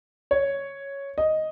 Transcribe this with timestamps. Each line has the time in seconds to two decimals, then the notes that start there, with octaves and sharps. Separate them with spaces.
0.31 C#5
1.18 D#5